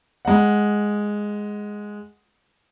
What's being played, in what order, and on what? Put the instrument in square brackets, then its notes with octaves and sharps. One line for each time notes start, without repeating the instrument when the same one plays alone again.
[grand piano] G#3 F#5